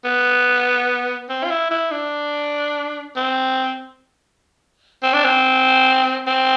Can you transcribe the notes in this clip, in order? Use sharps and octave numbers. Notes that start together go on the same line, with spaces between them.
B3
C4
F4
E4
E4
D4
C4
C4
D4
C4
C4